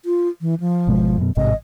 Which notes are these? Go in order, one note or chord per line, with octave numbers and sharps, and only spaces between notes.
F4
E3
F3
G#1 B2 G#3
F#2 B2
A1 G#2 C3 D#5